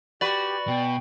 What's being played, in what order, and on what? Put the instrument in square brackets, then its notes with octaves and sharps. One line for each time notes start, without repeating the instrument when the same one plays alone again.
[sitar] F#4 B4 [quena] G4 [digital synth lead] D5
[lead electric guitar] B2 [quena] G5